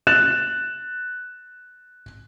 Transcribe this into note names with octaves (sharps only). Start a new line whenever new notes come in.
F#6 A6 E7